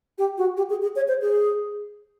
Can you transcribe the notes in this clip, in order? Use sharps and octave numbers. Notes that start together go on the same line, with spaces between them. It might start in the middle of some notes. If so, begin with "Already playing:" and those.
G4
F#4
G4
G#4
G#4
C#5
C5
G#4